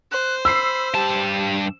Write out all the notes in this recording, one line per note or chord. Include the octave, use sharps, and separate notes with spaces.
C5 F#6
B5 E6 C7
G2 G4 A5